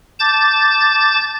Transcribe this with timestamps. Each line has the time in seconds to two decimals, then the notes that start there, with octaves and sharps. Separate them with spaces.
0.20 A5 D6 G6 A6